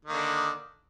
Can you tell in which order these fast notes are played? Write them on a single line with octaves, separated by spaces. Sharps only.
D#3 A#3 D3